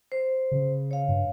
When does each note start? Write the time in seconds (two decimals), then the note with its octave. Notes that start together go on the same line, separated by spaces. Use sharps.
0.12 C5
0.51 C#3
0.91 C#5 F5
1.08 G2